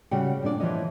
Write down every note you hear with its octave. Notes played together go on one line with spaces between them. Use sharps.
C#3 G3 F#4 F#5 G5
G2 A#2 D4 D5
E3 F3 C#5 D#5